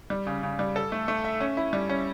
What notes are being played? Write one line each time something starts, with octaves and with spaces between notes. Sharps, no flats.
G3
C#3
C#3
G3
A4
A3
A3
E5
C#4
E4
G3
C#4